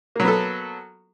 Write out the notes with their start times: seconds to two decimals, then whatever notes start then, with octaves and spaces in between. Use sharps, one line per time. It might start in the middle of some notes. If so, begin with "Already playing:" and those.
0.16 A#3
0.20 F#3
0.24 B3
0.28 A4